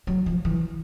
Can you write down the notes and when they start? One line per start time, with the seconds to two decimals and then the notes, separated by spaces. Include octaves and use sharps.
0.07 F#3
0.26 F3
0.45 E3